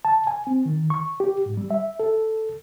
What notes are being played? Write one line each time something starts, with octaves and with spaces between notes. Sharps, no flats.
A5
G#5
C4
D#3
C#6
G4
G#2
G3
E5
A4